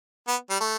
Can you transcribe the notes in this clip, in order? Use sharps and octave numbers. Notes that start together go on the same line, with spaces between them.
B3
G3
A3